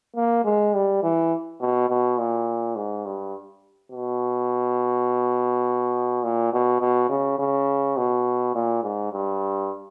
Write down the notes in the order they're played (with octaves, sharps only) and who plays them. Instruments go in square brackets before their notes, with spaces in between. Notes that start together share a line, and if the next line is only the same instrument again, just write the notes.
[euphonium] A#3
G#3
G3
E3
B2
B2
A#2
G#2
G2
B2
A#2
B2
B2
C#3
C#3
B2
A#2
G#2
G2